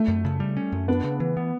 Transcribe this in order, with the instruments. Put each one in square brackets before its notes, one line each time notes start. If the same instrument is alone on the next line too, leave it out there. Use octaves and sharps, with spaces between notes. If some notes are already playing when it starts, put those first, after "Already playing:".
Already playing: [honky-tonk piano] A3
[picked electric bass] F#2
C#3
G3
C#4
F#2
[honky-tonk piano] B3 [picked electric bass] D4
[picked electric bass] C#3
E3
B3